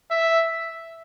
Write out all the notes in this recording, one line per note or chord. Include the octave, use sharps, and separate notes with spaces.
E5